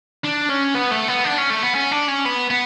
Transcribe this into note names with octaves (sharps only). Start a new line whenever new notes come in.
D4
C#4
B3
A3
B3
D4
C#4
A3
B3
C#4
D4
C#4
B3
B3